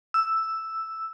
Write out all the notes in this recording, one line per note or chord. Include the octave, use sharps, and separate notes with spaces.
E6